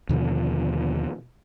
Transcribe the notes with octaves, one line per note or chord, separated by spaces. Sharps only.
D#2 B2 D3 F3